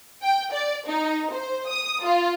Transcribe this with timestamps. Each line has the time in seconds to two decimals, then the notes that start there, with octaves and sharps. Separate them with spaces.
0.23 G5
0.52 D5
0.86 D#4
1.31 C5
1.68 D#6
2.04 F4